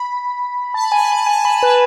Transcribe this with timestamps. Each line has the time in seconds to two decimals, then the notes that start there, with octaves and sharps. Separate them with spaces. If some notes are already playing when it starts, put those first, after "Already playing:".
Already playing: B5
0.74 A5
0.83 B5
0.92 G#5
1.00 A5
1.12 B5
1.18 A5
1.26 G#5
1.36 A5
1.45 B5
1.54 A5
1.63 B4